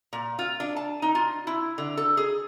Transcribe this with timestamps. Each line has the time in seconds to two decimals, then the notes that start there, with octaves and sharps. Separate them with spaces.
0.13 A#2
0.39 F4
0.60 D4
0.76 A5
1.02 D#4
1.15 F4
1.47 E4
1.78 D3
1.97 A4
2.17 G#4